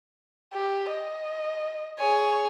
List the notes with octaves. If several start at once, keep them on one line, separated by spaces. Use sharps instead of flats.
G4
D#5
G#4 C#5 G#5